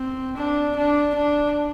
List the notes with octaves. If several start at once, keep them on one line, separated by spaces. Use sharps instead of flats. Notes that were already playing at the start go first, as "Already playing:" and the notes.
Already playing: C4
D4
D4
D4